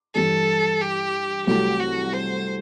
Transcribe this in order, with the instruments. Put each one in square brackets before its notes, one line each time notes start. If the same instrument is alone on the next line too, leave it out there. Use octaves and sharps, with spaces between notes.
[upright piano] G2 E3 G3 D4 [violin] A4
[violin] G4
[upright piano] C2 C3 F#3 A3 [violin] G4
[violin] F#4
C5